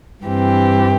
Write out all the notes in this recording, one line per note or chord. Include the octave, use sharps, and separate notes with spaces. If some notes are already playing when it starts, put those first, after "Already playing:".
G2 E3 C4 G4